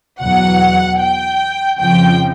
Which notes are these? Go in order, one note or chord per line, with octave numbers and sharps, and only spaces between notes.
E2 B2 F#3 F#5
G5
F2 C#3 F3 G5